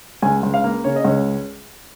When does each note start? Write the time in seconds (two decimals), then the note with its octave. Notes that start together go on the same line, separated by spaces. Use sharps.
0.22 C#2 G#5
0.43 C#2
0.54 F5
0.64 A#3
0.84 C#3 C#5
0.96 D#5
1.05 C#2 C#5